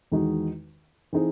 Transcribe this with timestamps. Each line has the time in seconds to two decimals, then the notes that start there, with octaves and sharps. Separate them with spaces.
0.12 E2 D#3 G#3 D#4 F#4
1.13 E3 C4 D#4 G#4